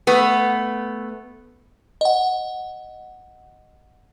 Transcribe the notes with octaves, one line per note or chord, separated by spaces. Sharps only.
A3 B3
D#5 F#5